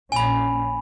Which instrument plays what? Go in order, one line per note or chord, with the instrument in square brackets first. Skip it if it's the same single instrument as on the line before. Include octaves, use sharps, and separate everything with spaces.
[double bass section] A#1 A#2 C#4 [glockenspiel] G#5 B5